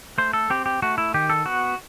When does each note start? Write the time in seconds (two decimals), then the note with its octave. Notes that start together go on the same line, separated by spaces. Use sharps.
0.18 A3 C5
0.33 A4
0.50 C4 G4
0.66 G4
0.82 A3 F#4
0.98 E4
1.14 D#3 G4
1.30 A4
1.46 B3 F#4